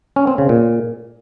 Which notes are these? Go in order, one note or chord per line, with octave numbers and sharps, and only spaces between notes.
C#4
C4
C#3
A#2